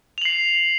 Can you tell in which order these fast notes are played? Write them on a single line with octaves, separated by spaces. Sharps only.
F7 F#7 C7